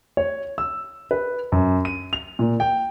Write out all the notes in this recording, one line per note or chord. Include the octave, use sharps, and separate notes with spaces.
C#5
E6
B4
F#2
D#7
F7
A#2
G5